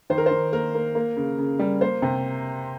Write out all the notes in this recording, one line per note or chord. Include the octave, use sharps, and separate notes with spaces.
D#3 C5
A#4
D#3 C5
A#3 A#4
A#3
A#3
C#3
C#3
G3
A#3 C5
C3